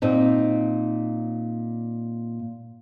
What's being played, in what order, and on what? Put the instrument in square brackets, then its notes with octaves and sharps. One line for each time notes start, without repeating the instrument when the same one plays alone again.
[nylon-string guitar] A#2 C4 D#4